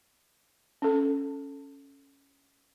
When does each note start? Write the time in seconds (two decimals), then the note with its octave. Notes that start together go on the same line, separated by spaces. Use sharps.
0.82 C#4 A4